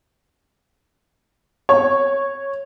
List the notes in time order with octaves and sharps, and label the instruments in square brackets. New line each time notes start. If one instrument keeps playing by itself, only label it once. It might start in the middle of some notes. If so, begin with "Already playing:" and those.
[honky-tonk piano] C#5